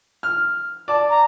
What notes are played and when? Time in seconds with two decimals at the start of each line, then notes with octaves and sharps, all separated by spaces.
0.23 F6
0.88 D5 A5
1.10 A#5